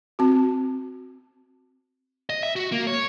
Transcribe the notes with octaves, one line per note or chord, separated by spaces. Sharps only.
C4 F#4
D#5
E5
F#4
A#3
C#5